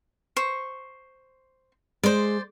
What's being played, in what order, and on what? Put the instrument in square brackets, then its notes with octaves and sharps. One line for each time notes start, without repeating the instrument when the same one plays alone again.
[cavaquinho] C5 C#6
[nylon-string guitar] G#3 [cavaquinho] C5 D5